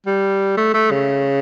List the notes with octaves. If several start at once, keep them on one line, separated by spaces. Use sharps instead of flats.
G3
A3
A3
C#3